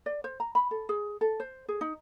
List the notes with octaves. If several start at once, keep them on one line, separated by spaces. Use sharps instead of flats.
D5
C5
A#5
B5
A4
G#4
A4
C5
G#4
D#4